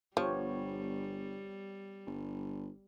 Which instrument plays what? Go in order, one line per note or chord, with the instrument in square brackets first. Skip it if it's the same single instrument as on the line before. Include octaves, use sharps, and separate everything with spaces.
[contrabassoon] G1 [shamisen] F3 [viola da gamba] G3 [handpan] B3 G4 C#5
[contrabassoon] G1